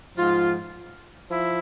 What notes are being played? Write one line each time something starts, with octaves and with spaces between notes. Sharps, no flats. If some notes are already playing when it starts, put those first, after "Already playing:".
G#2 F3 F4
F3 E4